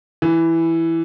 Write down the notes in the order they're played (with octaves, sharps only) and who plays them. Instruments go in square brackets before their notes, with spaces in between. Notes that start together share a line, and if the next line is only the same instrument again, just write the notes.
[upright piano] E3